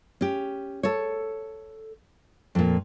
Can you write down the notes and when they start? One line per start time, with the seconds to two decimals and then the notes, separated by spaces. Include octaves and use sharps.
0.21 C#4 G4
0.83 A4 C#5
2.55 F2 A#2